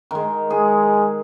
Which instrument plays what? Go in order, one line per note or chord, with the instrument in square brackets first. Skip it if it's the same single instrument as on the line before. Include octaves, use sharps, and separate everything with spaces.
[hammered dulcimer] D#3 G#3
[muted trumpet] G#3 [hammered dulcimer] G#4